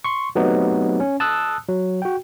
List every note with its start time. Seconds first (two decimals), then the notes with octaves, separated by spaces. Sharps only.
0.04 C6 C#6
0.35 F#3 A3 B3 C4 D#4 G4
1.00 C#4
1.20 A5 D#6 E6 F#6
1.68 F#3
2.02 F#4 G5